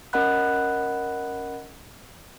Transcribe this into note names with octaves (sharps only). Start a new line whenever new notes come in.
C#4 A#4 D#5 F#5 B5 F#6